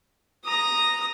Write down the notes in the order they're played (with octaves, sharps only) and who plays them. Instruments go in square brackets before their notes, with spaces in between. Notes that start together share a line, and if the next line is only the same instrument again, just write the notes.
[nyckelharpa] A#5 D#6